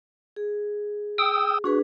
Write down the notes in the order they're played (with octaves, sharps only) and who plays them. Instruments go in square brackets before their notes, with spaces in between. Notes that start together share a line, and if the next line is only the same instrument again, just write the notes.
[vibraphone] G#4
[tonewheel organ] G5 D#6 E6
[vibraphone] D4 G#4 B4 [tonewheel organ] F#4